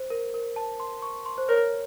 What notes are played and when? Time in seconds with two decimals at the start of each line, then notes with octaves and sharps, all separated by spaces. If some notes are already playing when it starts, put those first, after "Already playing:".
Already playing: C5
0.10 A#4
0.34 A#4
0.56 A5
0.80 C6
1.02 C#6
1.26 C6
1.38 C5
1.48 A#4 C#5